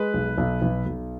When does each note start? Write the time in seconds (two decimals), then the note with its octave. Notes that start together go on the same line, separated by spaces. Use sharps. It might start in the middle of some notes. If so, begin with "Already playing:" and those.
Already playing: G#3 B4
0.14 B1
0.38 B1
0.62 B1
0.86 B1